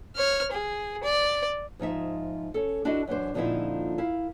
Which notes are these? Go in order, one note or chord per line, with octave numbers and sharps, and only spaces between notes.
C#5 F6
G#4
D5
G#2 F3 D#4 E5
C#4 A4
D4 E4 F#4 A4 D#5
F#2 E3 D4 C5
A#2 D3 F3 C4 D#4 E4
E4 A#4 F5